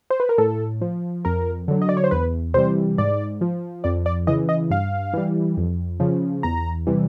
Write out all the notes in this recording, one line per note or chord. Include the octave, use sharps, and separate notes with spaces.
C5
B4
A#4
A2 A4
F3
F2 A#4
D3 F#3
D#5
D5
C#5
C5
E2 B4
C3 E3 G3 C5
G#2 D5
F3
F2 D5
D5
C#3 E3 D#5
D#5
G2 F5
E3 G3
F2
C#3 F3
E2 A#5
C3 E3 G3